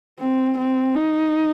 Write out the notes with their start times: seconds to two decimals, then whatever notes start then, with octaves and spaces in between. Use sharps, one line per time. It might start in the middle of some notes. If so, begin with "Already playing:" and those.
0.20 C4
0.58 C4
0.95 D#4